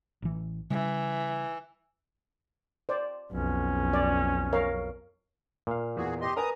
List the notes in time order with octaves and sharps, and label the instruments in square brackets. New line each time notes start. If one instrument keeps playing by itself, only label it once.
[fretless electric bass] A1 E3
[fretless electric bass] C#3 G3 [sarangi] E3
[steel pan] C5 D5
[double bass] B1 F2 [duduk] C#4
[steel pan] D5
A#4 C#5 F5
[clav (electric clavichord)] A#2 F5
[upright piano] E2 [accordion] F#4 G#4
[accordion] G4 D#5 C6
[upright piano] A#4 B4 G#5 [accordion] A#5 D#6